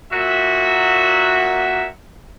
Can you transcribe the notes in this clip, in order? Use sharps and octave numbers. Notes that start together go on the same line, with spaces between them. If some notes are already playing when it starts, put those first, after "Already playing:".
A#2 F#4 E5